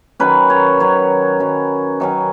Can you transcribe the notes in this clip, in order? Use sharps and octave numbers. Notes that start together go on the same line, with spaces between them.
D#3 F#3 C#4 B4
C#5
D#3 F#3 C#4 C#5
D#3 F#3 C#4
D#3 F#3 C#4